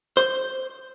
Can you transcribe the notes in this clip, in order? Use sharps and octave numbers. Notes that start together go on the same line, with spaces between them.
C5